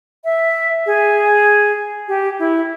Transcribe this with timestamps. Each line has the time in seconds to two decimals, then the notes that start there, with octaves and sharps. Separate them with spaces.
0.24 E5
0.86 G#4
2.08 G4
2.39 E4